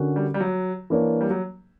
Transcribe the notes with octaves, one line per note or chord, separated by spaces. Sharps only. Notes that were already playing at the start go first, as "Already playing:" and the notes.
Already playing: D3 C#4 F#4 A#4
G3
G3
F#3
E3 A#3 D4 A#4 C#5
G3
F#3